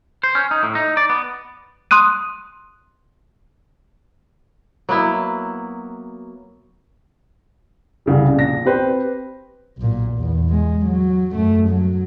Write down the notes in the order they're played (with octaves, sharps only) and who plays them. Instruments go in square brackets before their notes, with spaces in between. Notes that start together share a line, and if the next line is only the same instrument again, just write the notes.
[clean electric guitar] C5
C#4
D#4
A2
D#4
D5
B3
[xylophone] C6 D#6 F#6 D#7
[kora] F#3 A#3 B3 E4
[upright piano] C2 C#3 G3
A#1 A#6
C4 G4 B4 C5
[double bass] B1 A#2
E2
G#3
F#3
F#2 A3
F#3